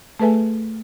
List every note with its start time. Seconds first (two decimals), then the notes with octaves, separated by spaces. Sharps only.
0.20 A3 G#4 A4 B4 E5 G#5